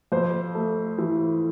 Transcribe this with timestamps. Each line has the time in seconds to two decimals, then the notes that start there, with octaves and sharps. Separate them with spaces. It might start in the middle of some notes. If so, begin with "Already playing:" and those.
0.12 F2 C5
0.55 A3
0.98 E3